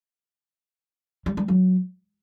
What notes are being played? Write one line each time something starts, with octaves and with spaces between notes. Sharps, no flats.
G3
G3
F#3